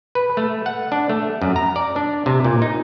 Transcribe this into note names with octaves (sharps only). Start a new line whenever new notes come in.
B4
A3
F#5
D4
A3
F#2
A#5
D5
D4
C3
A#2
D#4